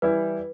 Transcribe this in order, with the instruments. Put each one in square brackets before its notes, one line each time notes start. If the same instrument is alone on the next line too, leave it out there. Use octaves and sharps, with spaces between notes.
[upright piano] E3 G3 E4 [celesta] B4